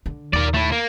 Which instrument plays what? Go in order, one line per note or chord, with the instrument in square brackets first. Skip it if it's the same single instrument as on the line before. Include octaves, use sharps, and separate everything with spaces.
[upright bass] D3
[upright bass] D#2 [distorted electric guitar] A#4 D5
[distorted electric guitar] A3 E4
A#3